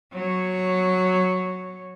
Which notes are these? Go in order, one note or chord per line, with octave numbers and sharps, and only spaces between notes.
F#3 C#5